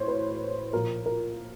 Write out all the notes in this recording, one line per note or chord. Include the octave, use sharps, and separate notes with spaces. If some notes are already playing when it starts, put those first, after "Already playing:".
Already playing: A2 E3 C5 C#5
B4
A#2 F3 A#4
A#4